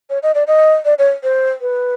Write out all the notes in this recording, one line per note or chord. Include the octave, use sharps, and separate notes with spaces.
C#5
D#5
D5
D#5
D5
C#5
C5
B4